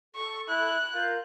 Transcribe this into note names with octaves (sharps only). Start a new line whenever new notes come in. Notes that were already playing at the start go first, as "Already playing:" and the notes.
A4 C#6
E4 F#6
F4 A#4 F5 G6